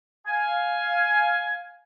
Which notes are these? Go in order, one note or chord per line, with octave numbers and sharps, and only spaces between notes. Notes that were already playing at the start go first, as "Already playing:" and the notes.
F5 G#5